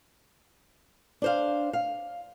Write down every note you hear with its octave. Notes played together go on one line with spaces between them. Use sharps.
D4 C5 F5
F5